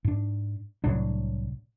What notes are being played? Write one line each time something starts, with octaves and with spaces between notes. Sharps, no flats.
G#2 D4
C2 A2 F#3 D4